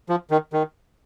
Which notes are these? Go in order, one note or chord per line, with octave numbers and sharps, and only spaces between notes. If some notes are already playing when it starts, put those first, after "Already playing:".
F3
D#3
D#3